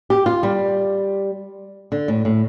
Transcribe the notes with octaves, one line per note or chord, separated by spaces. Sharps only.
G4
F4
G3
D3
A2
A2